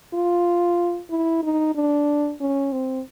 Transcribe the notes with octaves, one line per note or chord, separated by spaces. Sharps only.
F4
E4
D#4
D4
C#4
C4